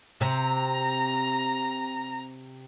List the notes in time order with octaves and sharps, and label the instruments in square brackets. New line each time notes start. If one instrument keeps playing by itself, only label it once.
[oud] C3 [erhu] A#5